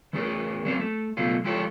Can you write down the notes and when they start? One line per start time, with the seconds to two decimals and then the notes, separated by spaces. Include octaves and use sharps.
0.13 E3 A3 C#4 G#4 A#4 C#5
0.65 F#3 A#3 C4 C#4 E4 F#4
0.80 A3
1.17 C#2 B2 F#3 A3 C#4 F4
1.44 F3 G#3 E4 G4 A4 C#5